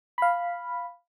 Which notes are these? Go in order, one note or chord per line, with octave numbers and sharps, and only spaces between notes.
F5 B5